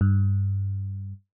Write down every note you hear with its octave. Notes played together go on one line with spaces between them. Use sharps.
G2